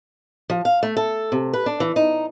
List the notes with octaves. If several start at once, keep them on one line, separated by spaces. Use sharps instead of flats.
F3
F5
A3
A4
C3
B4
D4
E3
D#4